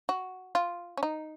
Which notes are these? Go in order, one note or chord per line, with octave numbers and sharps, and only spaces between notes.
F#4
F4
C#4
D#4